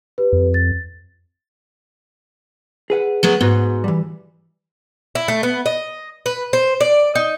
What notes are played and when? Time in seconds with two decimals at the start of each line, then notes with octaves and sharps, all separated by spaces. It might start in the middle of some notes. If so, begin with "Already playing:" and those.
0.18 G4 B4
0.33 F2
0.54 A6
2.90 G#4 B4 F#5
3.23 F#3 G#3 B3
3.41 G#2 B3 F#4 B4
3.84 E3 G3
5.15 E4
5.28 A3
5.43 B3
5.66 D#5
6.26 B4
6.53 C5
6.81 D5
7.15 D#4